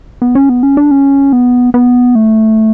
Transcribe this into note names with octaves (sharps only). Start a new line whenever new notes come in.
B3
C#4
B3
C#4
D4
C#4
B3
B3
A3